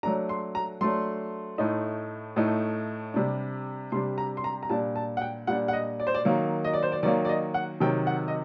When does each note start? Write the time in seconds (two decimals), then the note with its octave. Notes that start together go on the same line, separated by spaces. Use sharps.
0.03 F#3 A3 D4 A#5
0.29 C6
0.55 A#5
0.81 F#3 A3 D4 C6
1.58 A2 A3 D#4
2.36 A2 A3 D#4
3.14 C3 G3 D4
3.92 C3 G3 D4 C6
4.18 A#5
4.37 C6
4.44 A#5
4.63 A#5
4.69 A#2 G3 D4 A5
4.96 A5
5.17 F#5
5.21 G5
5.47 A#2 G3 D4 F#5
5.68 F#5
5.73 D#5
6.00 D5
6.07 C5
6.14 D5
6.25 D#3 F#3 A#3
6.65 D#5
6.73 D5
6.83 C5
6.92 D5
7.03 D#3 F#3 A#3 D5
7.25 D5
7.29 D#5
7.54 F#5
7.80 C3 D#3 F#3 G5
8.07 F#5
8.28 D#5